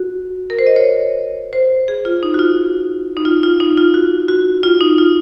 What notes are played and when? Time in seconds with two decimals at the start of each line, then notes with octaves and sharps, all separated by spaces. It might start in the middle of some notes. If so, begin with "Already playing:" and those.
Already playing: F#4
0.50 A#4
0.59 C5
0.67 D#5
0.76 C#5
1.53 C5
1.88 G#4
2.05 F4
2.23 D#4
2.34 F#4
2.39 F4
3.17 D#4
3.25 F4
3.43 F4
3.60 D#4
3.78 F4
3.94 F#4
4.28 F#4
4.63 F4
4.81 D#4
4.98 F4